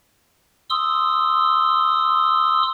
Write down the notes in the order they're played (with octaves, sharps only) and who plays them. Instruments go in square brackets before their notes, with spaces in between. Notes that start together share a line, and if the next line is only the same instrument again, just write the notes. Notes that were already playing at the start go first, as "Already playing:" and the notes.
[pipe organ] C6 D#6 E6